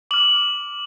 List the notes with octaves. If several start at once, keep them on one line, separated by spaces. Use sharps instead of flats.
D6 F6 F#7